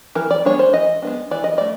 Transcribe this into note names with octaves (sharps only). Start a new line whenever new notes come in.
E3 A#4
D5
G#3 B3 D4 C#5
C5
E3 D#5
G#3 B3 D4
E3 D5
D#5
A3 D5